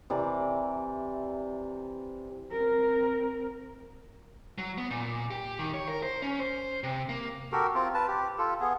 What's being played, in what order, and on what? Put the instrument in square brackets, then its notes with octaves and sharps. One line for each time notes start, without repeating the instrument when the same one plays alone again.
[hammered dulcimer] C3 E3 D5 A#5
[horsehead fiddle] C4 A#4
[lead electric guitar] F#3
B3
A#2
G4
D#3
C#5
A#4
C5
C#4
C5
C3
A#3
[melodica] F#4 G4 A4 A#4
C4 F4
B4 A5
G4
F4 A4
B3 G#4